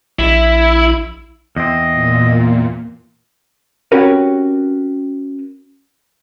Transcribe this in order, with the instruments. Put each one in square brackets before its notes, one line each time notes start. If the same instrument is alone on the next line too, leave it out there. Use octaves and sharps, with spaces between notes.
[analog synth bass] A#1 [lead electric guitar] E4
[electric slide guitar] E2 C4 [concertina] D#5
[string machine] A#2
[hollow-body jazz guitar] C4 C#4 F#4 G4 A#4 B4